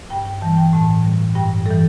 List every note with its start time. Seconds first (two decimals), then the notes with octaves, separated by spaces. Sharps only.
0.10 G2 G5
0.25 G5
0.41 E3 G3 A5
0.57 G5
0.73 A2 A5
1.04 G3
1.35 G2 G5
1.66 E3 G3 A4